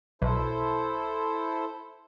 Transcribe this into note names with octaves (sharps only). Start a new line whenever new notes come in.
B1 E4 A4 C5